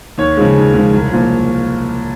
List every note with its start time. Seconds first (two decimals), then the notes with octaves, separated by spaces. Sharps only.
0.18 D#2 C#5
0.37 C#3 F3 G#3
0.56 D#2
0.74 C#3 F3 G#3
0.94 C2
1.12 A#2 F3